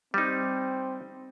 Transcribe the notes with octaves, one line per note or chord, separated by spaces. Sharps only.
G3 C4 D#4